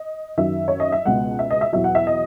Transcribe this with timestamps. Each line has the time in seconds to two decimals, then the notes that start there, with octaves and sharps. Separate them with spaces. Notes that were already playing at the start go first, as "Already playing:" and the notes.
Already playing: D#5
0.37 F#2 D#3 F#3 E5
0.68 C#5
0.80 D#5
0.92 E5
1.05 C#2 B2 G#3 F#5
1.39 E5
1.51 D#5
1.61 E5
1.73 E2 B2 F#3 E5
1.84 F#5
1.95 E5
2.07 D#5